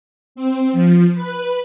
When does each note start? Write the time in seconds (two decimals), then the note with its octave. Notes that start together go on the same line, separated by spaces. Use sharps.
0.35 C4
0.73 F3
1.15 B4